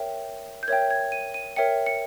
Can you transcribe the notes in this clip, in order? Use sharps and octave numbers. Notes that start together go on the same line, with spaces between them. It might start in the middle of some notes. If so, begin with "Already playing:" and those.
Already playing: A#4 C#5 E5 G5
G6
A#4 C#5 E5 G5 G#6
G#6
D#7
D#7
A#4 C#5 E5 G5 C#7
C#7